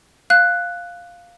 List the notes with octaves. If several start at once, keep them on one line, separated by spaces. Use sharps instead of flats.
F5 F#6